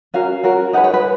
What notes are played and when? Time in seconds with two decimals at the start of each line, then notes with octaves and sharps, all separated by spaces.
0.14 C#4 F#4 A#4 F5
0.43 C#4 F#4 A#4
0.73 D#4 G#4 B4 F#5
0.84 C#5
0.94 B4